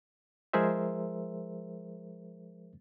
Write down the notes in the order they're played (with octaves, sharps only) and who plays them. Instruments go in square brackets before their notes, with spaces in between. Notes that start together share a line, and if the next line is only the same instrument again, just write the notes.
[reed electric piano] F3 G#3 G#4 A#4 C5 E5